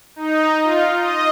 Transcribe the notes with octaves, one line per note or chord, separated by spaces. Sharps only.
D#4
F4
D#5